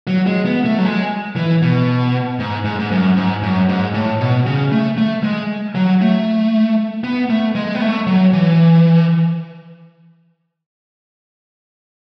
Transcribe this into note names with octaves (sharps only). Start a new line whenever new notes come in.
F#3
G#3
B3
A3
F#3
G#3
E3
B2
G#2
G#2
G#2
F#2
G#2
F#2
G#2
A2
B2
C#3
A3
A3
G#3
F#3
A3
B3
A3
G#3
B3
A3
F#3
E3